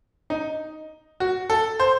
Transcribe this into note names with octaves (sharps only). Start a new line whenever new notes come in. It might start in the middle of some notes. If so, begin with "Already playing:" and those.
D#4
F#4
A4
C5